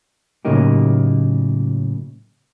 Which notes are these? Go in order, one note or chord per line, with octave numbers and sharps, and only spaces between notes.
A2 C#3 F#3 A#3 D#4 G4